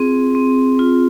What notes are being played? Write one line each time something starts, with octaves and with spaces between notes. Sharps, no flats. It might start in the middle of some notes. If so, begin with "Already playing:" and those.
Already playing: C4 F4 G#4
C4
F4